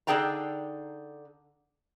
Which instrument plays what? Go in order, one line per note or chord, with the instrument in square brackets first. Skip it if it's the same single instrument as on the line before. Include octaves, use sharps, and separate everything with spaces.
[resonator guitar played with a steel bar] D3 D#4 G#4 G5 A5 A#5